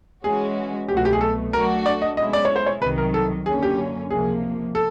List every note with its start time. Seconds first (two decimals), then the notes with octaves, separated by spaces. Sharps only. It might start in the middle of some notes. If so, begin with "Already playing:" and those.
0.24 E3 G#3 C#4 F#4 G#4
0.88 C2 B2 F#3 A3 G4
0.97 F#4
1.05 G4
1.13 G#4
1.21 A4
1.53 F#3 A3 D4 F#4 A#4
1.86 D5
2.02 D#5
2.17 B2 G#3 C#4 E4 D#5
2.33 D5
2.45 C#5
2.56 C5
2.66 C#5
2.82 C2 C3 D#3 F#3 B4
2.98 A#4
3.14 A4
3.46 F#2 D3 F#3 A#3 C#4 G#4
3.63 G4
4.11 C#2 C3 F3 A#3 G#4
4.75 A4